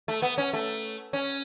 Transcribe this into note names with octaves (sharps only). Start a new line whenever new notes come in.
A3
B3
C#4
A3
C#4